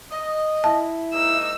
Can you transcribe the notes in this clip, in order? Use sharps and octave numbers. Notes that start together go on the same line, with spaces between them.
D#5
E4 A5
G#2 A#3 D#4 E6